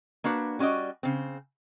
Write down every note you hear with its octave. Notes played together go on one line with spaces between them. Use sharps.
A#3 D4 F#4 B4
G3 C#4 F#4 D5 D#5
C#3 C4